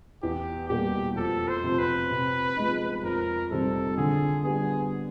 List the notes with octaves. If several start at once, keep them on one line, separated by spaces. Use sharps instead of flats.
E2 G4
B2 G3 A#3 G4
F2 A4
C5
C3 F3
B4
C3
F3 G#3 B3 D#4
F2 A#4
C3 D#3 G3 C4 A4
D3 G#4
G3 B3 G#4